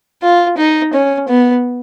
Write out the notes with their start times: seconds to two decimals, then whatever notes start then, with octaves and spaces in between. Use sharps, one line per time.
0.22 F4
0.57 D#4
0.93 C#4
1.28 B3